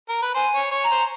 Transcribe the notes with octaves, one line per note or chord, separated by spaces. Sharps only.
A#4
B4
C5 G#5
C#5
C#5
A#5
C5